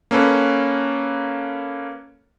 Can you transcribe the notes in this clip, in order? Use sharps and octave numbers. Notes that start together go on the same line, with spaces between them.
A#3 C#4 A4 B4